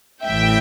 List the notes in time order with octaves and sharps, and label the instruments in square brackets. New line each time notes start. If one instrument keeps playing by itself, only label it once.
[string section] A1 A2 E3 E5 G5